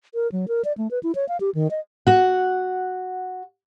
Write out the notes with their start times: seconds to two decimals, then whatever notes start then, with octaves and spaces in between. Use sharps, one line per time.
0.14 A#4
0.32 F#3
0.48 A#4
0.65 D5
0.78 A3
0.91 B4
1.03 E4
1.15 C#5
1.29 F5
1.40 G4
1.55 D#3
1.71 D#5
2.07 F#4 F#5